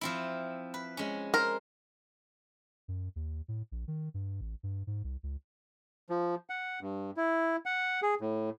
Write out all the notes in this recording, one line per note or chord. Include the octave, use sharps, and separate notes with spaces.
F3 C4 E4
B4
G#3 C#4
A#4 C5
F#2
D#2
A2
A#1
D#3
G2
A1
G2
G#2
C2
C#2
F3
F#5
G2
E4
F#5
G#4
A2